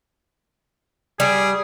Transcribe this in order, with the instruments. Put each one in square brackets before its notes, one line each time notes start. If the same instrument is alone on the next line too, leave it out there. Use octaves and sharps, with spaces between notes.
[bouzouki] G3 [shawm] G#4